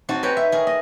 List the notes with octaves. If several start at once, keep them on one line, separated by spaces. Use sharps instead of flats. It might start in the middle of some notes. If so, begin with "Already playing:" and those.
C4 D#4 F#4 A5
B4 C#5 G5 G#5 A#5
E5
G#4 A#4
D#5